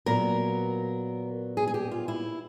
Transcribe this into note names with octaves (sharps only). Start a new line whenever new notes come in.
A#2 F#3 B3 A#4
G#4
G#4
G4
F4
E4